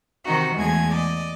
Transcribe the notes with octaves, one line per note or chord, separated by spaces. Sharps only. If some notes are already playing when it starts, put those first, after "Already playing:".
C3 D#3 D#4 F#4
E2 G#3 A3 G#4 G#6
D5 D#5